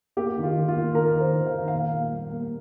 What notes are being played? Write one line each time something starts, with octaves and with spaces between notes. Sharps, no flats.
A#3 G4
D#3
F4
D#3
F4
A#3
D#3 A#4
D#3
C5
D#3
F5
D#3
A#2 F5
A#3
G3
A#3